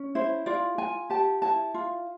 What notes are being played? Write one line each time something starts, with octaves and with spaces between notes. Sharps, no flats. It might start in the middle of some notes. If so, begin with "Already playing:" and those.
Already playing: C#4
E4 C5
F4 D5
F4 G#5
G4 A5
E4 A5
F4